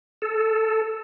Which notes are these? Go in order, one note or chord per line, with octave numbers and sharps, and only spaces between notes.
A4